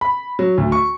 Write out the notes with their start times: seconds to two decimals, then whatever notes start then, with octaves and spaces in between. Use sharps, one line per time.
0.01 B5
0.39 F#3
0.58 D2
0.72 C#6